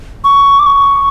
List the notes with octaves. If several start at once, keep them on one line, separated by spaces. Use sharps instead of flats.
C#6
D6
C#6